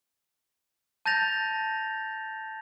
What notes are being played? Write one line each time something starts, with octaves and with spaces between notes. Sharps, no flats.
A5 G6 A6 A#6 F7